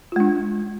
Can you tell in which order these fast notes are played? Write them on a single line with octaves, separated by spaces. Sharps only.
F4 G#3 D4